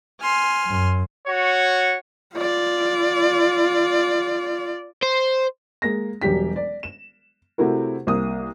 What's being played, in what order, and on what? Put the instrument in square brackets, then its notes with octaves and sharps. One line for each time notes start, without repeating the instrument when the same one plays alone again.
[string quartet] G#5 C6 F6
[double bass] F#2
[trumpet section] F#4 C#5
[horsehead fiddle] F4 D5
[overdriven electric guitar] C5
[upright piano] G#3 A#3 A#6
E1 F#3 G3 G4 B6
D5
E7
C3 A3 C4 E4 F#4 A#4
C2 A#3 D#6